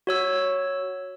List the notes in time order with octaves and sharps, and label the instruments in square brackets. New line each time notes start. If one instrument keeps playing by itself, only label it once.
[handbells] F#4 C#5 E6